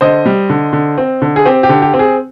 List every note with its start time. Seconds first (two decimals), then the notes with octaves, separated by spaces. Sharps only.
0.01 D3 C5 D#5
0.26 G3
0.50 D3
0.73 D3
0.98 C4
1.22 D3
1.36 G#4
1.46 C4 G4
1.63 G4
1.69 D3
1.82 G4
1.94 C4
1.99 G#4